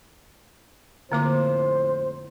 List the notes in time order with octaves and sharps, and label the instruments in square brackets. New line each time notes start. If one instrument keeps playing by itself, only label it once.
[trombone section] F2 A2 C5 [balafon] D3 A#3 D6